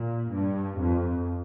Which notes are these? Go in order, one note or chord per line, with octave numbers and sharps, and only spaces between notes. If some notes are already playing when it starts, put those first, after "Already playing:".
Already playing: A#2
G2
F2